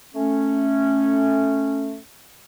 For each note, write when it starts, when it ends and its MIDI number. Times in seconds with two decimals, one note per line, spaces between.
0.14 1.96 57
0.14 1.96 61